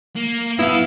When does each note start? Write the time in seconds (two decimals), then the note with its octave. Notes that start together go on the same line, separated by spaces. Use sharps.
0.16 A#3
0.59 G2 B3 E4 F5 A5